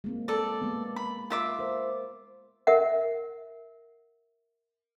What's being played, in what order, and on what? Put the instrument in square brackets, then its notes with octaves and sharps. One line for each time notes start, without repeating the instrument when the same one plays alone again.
[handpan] G#3 A#3 C4
[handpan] G#3 [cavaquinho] A4 D5
[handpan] G#3 A#3 B3
[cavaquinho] B5
F4 E5 D6
[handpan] A#4 C5
[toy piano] A#4 E5 F#5